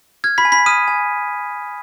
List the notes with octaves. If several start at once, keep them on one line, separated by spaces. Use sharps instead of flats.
F6 G#6
B5 B6
G#5
B5 B6
D#6 F6 D#7
G#5